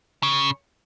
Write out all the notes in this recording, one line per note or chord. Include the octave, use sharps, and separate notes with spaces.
C#3